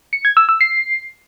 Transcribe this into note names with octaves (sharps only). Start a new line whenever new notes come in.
C#7
G#6
E6
E6
C7